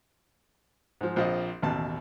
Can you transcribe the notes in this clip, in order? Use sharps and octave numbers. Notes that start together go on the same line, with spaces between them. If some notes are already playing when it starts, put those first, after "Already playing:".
G#2 F3
A#1 F3 C4 F4 D#5
A1 D#2 B2 A5